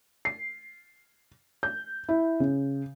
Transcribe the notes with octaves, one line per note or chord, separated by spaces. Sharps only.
C7
G6
E4
C#3